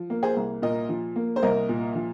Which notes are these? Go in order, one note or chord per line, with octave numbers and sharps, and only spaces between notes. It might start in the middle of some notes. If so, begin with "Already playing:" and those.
Already playing: F3
A#3
G#4 C5
C2
A#2 A#4 D#5
F3
A#3
C5
C2 A#4 D#5
A#2
F3